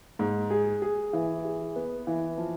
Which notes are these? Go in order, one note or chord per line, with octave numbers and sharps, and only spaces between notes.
G#2
G#4
G#4
E3
G#4
B3
E3
F3